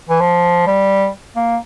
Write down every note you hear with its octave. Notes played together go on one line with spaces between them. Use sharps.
E3
F3
G3
A#3